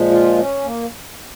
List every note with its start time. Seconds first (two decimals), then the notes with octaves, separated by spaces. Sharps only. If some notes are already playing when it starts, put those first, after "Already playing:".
Already playing: A#2 F3 G#3
0.10 F4
0.38 C#4
0.65 A#3